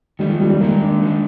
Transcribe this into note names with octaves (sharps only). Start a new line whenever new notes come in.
D#3 G3 G#3 D#4
F3
G3
G3
D#3 G#3 A#3 D#4
D4
D#3 G#3 D#4